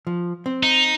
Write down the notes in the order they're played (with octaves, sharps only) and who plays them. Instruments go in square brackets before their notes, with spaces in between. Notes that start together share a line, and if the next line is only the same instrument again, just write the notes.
[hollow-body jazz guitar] F3
C4
[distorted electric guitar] D#4